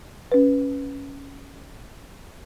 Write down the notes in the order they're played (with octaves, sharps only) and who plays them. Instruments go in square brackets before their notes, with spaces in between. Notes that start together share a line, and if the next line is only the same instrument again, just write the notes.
[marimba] C#4 B4